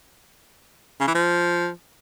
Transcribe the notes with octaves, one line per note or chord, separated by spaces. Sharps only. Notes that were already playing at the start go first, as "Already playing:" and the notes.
C#3
E3
F3